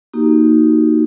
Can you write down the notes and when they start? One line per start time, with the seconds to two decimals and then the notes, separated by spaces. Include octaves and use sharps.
0.13 A#3 D#4 F#4 G4